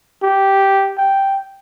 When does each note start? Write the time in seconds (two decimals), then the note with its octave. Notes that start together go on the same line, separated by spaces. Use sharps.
0.23 G4
0.97 G5